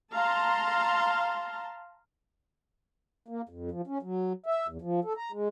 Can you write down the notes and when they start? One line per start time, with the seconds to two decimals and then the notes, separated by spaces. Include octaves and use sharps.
0.13 F5 A5 A#5 C6
3.28 A#3
3.49 F2
3.71 F3
3.87 C#4
4.02 F#3
4.46 E5
4.68 E2
4.82 F3
5.05 A4
5.17 A#5
5.32 G#3